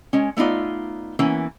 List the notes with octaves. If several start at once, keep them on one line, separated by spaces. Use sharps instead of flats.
G#3 C#4
A3 B3 D#4 F4 D5
E3 A#3 B3 C#4